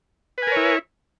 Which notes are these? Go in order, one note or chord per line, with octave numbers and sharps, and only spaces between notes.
E4 A#4 B4 C#5 G#5